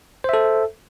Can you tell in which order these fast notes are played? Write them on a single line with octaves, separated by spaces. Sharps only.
C5 E5 A4